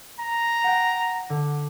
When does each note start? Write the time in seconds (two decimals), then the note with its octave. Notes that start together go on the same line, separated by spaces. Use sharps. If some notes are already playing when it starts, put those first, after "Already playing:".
0.20 A#5
0.64 F#5 G5
1.30 D3